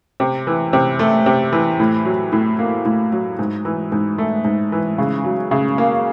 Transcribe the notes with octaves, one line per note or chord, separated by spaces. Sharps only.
C3
E3
C3
A3
C3
E3
A2
F#3
A2
A#3
A2
F#3
G#2
E3
G#2
A3
G#2
E3
C#3
F#3
C#3
A#3